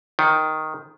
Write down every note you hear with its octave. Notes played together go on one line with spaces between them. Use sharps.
D#3